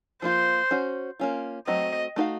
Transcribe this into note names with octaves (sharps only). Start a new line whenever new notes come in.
F3 A#3 F4 C5
C#4 F#4 C5
A#3 C#4 F4
F#3 A3 C4 D#5
A3 D#4 F#4 C5 F5